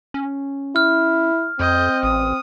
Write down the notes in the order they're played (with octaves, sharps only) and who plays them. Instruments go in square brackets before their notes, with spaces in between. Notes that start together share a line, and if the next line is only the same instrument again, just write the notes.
[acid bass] C#4
[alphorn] E4 [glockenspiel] F6
[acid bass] F2 [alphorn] C4 [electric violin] D#5 G6
[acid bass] A1 [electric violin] D#6